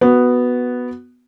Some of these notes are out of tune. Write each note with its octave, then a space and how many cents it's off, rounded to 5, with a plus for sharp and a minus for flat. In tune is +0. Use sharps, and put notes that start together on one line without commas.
B3 +0 F#4 +0